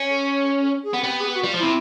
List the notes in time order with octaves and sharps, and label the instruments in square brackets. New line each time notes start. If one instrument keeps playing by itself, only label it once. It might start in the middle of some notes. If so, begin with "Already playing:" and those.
Already playing: [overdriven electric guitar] C#4
[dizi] A4
G#4
[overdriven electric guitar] B3
[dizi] G4
[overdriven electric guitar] B3
[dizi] G#4
G4
F#4
[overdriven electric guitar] G3 [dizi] F4
[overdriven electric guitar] F3
[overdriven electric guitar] C3 [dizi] E4